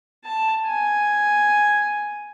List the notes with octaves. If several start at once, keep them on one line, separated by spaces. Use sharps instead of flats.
A5
G#5